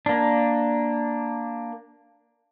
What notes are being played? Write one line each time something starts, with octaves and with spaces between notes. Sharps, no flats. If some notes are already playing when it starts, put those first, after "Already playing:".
A#3 D4